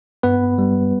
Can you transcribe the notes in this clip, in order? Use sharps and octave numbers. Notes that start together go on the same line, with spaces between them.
G2 B3 B4
G3